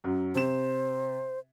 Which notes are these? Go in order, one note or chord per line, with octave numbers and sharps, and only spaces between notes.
F#2 F#3
C3 C5 E7